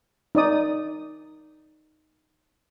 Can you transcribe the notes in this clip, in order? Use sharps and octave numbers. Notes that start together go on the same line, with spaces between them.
D#4 D5 D#6